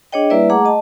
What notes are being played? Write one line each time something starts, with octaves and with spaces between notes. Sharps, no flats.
D4 G#4 C#5 D#5 G5
G3 A#3 E4 B4 D5 E5
A3 G#4 F#5 A#5 D6
D#5 A5